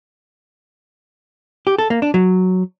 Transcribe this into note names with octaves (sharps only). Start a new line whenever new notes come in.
G4
A4
A#3
D4
F#3